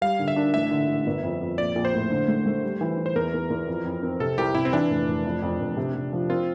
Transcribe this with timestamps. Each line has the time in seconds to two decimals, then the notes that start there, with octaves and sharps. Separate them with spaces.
0.01 G3 F5
0.19 D3
0.28 E5
0.36 D4
0.54 A1 E5
0.71 D3
0.88 A1
1.06 G1
1.23 F2
1.42 F2
1.58 A#1 D5
1.75 A#1
1.85 C5
1.94 A2
2.11 D3
2.28 A3
2.46 A3
2.63 G3
2.81 E3
2.98 E3
3.06 C5
3.15 E2 A#4
3.34 E2
3.50 E2
3.67 F2
3.85 F2
4.02 C4
4.20 C3 A4
4.38 C2 G4
4.55 C3 E4
4.65 C4
4.73 E3 D4
4.90 F1
5.08 F1
5.25 F2
5.42 F2
5.60 F1
5.77 C3
5.95 C3
6.13 F3
6.30 C4 F4